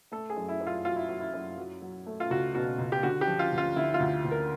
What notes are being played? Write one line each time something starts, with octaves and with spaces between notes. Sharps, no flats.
A3 A4
G#4
F#2
E4
F#2
F4
F#3 F4
E4
F#3
E4
F#2
F#3
F#3
A3
F4
C#2 F#4
B2 F#4
C#2
G4
D3 F#4
G4
F3
F4
D2
F4
D3 E4
F4
D2
D2
A#4